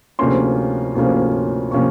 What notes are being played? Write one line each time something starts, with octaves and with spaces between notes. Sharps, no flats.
D2 C3 F3 A#3 C#4 C6
D2 C3 F3 A#3 C#4
C3 F3 A#3 C#4 C#6